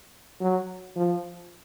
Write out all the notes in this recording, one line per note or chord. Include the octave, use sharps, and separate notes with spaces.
F#3
F3